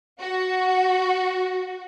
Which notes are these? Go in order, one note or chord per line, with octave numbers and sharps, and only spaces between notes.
F#4